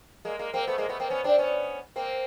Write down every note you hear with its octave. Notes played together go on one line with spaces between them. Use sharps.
G#3 A#3
G#3 A#3
A#3 C4
A3 B3
G#3 A#3
A3 B3
A#3 C4
B3 C#4
C4 D4
B3 C#4
A#3 C4